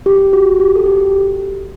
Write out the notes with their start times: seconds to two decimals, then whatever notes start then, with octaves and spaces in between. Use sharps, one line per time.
0.06 G4
0.33 F#4
0.60 G4
0.76 A4
0.86 G4